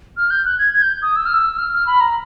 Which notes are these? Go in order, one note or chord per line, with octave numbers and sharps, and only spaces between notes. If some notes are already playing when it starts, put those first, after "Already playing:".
F6
G6
F#6
G#6
G#6
G6
D#6
E6
F6
E6
F6
F6
B5
A#5